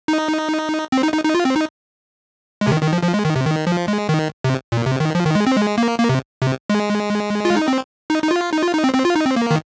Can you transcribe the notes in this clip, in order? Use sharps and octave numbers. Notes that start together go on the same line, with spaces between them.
D#4
C4
D#4
D#4
D#4
F4
C4
D#4
G#3
C3
D#3
D#3
F3
F3
G#3
D#3
C3
D#3
F3
G#3
D#3
C3
A#2
C3
D#3
F3
D#3
G#3
C4
G#3
A#3
A#3
C3
C3
G#3
F4
D#4
C4
D#4
D#4
F4
D#4
F4
D#4
C4
C4
F4
D#4
C4
A#3
D#3